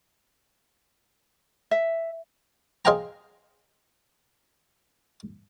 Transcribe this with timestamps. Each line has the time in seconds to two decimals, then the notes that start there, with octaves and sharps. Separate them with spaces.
1.71 E5
2.85 G#4 C5 D#5 F5 G5 A#5